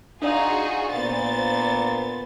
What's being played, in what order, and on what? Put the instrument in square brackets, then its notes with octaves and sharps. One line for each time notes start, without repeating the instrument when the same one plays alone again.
[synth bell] D4 D5 F5 [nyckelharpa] D#4 [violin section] F4 F#4 G#4
[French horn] A#2 [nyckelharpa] B3 [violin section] C5 A6